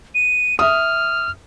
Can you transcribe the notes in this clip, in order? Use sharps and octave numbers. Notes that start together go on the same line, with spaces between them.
D#7
E5 D#6 F6